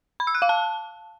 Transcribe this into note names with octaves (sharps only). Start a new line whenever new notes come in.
B5
E6
F#6
F5
A5